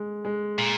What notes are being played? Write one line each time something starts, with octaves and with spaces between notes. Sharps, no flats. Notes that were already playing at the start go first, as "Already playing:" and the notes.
Already playing: G#3
G#3
A#2